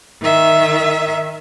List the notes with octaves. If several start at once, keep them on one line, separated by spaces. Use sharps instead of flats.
D#3 E5